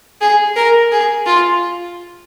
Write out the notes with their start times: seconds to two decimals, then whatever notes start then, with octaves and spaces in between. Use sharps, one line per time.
0.21 G#4
0.56 A#4
0.92 G#4
1.27 F4